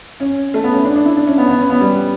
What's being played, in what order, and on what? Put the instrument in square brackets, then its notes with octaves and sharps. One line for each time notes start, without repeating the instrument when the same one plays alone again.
[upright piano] C#4
A3
B3
C#4
D4
D4
E4
D4
C#4
B3
B3
C#4
B3
G3